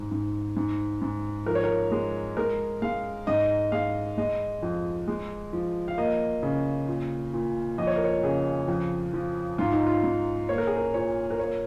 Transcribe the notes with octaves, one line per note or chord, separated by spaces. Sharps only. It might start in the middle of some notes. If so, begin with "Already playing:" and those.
Already playing: G#2
G#2
G#2
G#2
F3 A#4
C#5
A#4
G#3
G#3 A#4
G#3 F5
G#2 D#5
G#3 F5
G#3 D#5
F2
G#3
F3
F5
A#3 D#5
C#3
A#2
A#2
F2 D#5
C#5
A#4
C#5
C#3 G#4
F2
F3
G#2 F4
D#4
F4
G#2
A#3 C#5
A#4
G#4
A#4
A#2 C#5
A#4
A#3 C#5